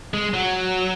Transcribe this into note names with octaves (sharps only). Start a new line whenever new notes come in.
G#3
F#3